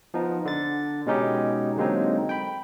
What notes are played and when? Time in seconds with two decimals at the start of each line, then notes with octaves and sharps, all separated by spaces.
0.14 F3 B3 D#4
0.45 D3 A6
1.06 B2 G#3 C#4 D#4 G4
1.77 D3 F#3 G#3 A#3 C4 D#4
2.29 G5 B5